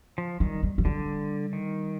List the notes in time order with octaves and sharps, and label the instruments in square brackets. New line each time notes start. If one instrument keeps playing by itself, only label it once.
[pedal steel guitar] F3
[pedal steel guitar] D#3 [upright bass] G3
[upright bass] G3
F3
[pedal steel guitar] D3 [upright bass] G3
[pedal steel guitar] D#3